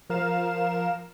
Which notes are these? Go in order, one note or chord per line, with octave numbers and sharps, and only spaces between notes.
F3 A#4 F5 E7